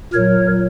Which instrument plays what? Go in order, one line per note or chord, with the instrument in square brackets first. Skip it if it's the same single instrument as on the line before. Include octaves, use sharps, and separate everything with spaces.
[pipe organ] A#2 F#3 A#4 C#5